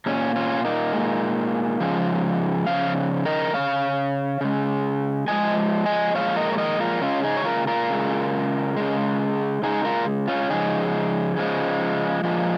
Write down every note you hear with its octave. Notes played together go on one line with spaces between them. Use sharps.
A#2 G#3 C#4
C#4 F4
A#3 D#4
A#2 G#3
C#3 F3 G#3
C#3 F3 F5
A#4 D#5
C#3 G#3 C#5 F5
C#3 G#3
A#2 F3 G#3 D#5 G#5
D#5 G#5
A#2 F3 G#3 C#5 F5
A#4 D#5
C#5
A#4 D#5
F4 A#4
C#3 G#3 C#4 F4
D#4 G#4
C#5
F4 A#4
F4 A#4
C#3 G#3
C#3 G#3
C#3 G#3 D#4 G#4
F4 A#4
C#4 F4
C#3 F3 G#3 D#4 G#4
C#3 F3 G#3
A#2 F3 G#3